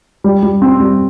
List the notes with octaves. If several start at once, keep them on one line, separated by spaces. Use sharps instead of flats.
G3
G3
C4
G3